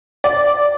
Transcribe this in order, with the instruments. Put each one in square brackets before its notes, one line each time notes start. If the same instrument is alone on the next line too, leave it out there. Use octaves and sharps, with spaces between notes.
[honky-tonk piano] D5